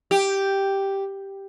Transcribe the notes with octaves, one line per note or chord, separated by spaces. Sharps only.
G4